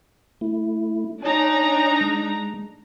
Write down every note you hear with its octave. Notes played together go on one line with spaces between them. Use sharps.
A3 E4
D4 D#4 C#5 G#5 A#5
G#3